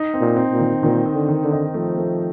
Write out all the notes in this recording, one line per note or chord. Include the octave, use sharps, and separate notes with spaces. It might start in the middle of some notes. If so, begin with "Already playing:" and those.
Already playing: D#4
C4
A#2
C4
A#2
D#3
A#2 D#3
C4
D3
D#3
D3
D#4
F3 A3
A3